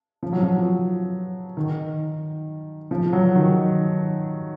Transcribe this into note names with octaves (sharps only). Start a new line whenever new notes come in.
F3
F#3
F3
D#3
F3
F#3
D#3